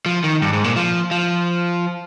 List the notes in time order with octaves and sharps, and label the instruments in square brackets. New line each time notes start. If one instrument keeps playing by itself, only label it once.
[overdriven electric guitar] F3
D#3
G2
G#2
A#2
F3
F3